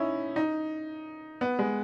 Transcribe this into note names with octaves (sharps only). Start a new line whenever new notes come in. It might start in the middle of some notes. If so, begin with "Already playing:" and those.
Already playing: C#4 D#4 E4
D#4
B3
G#3